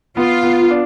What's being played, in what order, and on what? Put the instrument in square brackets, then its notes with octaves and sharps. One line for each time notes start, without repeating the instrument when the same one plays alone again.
[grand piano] B3 [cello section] F4
[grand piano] B3
D4